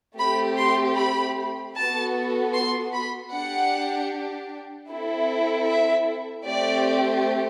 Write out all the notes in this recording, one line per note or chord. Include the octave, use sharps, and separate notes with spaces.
A3 C4 G4 B5
C6
B5
B3 F#4 A4 A5
C6
B5
D4 G4 F#5
C4 E4 A4
E5
A3 C4 G4 D5